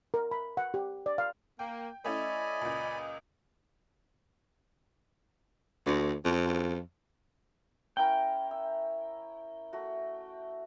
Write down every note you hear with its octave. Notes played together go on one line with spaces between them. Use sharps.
A#4
B5
F#5
G4
D5
F5
A#3 G5
A3 C#4 E4 D5 D#5 G#5 B5
C#2 A#2
D2
F2
C#4 E4 A#4 G5
E5
A3 F#4